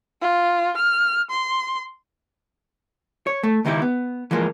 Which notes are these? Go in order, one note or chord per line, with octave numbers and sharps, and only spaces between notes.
F4
F6
C6
C#5
A3
C#2 D#3 D#4 E4 G4
B3
E3 F3 G#3 A#3